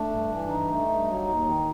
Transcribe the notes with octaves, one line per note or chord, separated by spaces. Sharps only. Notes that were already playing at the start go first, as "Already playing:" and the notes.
Already playing: A3 D4
G2
E3
G2 D#4
A3
G2
F#3
D#2
D#3